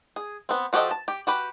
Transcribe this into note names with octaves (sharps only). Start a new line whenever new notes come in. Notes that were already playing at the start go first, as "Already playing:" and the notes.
G#4
B3 C4
F3 F#4 G4 A4 D#5
A5
G4
F#4 G4 B4